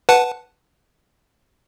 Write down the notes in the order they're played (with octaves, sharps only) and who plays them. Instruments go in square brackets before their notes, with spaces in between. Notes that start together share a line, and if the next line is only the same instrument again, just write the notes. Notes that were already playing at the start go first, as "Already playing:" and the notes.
[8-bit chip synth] B4 F#5 A5